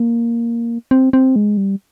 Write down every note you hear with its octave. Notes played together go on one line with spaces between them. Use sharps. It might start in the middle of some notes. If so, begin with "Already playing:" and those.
Already playing: A#3
C4
C4
G#3
G3